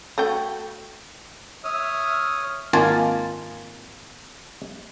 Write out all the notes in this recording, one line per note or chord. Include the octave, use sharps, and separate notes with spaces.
A3 F#4 G5
C#5 E5 D#6 F6
G#1 A#3 F4 G#5 A5